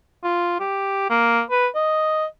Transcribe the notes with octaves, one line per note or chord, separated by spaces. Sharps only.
F4
G4
A#3
B4
D#5